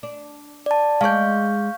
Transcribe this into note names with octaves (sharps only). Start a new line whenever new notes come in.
D4
D5 A5
G#3 D5 F5 C#6 G6